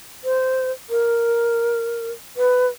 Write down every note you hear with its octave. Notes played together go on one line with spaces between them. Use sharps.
C5
A#4
B4